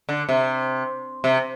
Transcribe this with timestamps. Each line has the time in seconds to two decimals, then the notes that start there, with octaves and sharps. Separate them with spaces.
0.09 D3
0.29 C3
1.24 C3